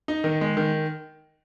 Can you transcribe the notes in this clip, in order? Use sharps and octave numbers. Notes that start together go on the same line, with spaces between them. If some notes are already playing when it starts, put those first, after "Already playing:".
D#4
D#3
G#3
D#3